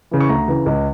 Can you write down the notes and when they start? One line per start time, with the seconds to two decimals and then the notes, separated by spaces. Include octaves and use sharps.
0.11 C#3 E3
0.21 C#6
0.29 D2 A#5
0.48 C#3 E3
0.66 C#2